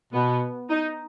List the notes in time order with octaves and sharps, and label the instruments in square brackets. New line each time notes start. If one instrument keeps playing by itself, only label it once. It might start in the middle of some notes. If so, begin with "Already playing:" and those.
[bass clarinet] B2 [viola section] B3
[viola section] D#4